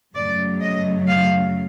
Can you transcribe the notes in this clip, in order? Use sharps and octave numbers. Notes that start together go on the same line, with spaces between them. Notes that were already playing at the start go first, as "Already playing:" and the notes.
F#2 C#3 F#3 A3 D5
D#5
F5